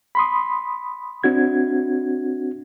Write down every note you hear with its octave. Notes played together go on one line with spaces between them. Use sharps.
B5 C6 D#6
C4 D4 F#4 G#6